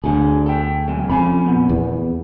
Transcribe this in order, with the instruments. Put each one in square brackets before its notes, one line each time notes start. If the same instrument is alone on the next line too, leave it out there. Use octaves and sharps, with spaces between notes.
[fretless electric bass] D2 [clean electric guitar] D3 G#4
[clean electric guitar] A4 G5
B1 C#3 G#3
[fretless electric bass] F2 [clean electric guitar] C#4 G#5 B5
[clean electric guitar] A#2 B3
[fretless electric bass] E2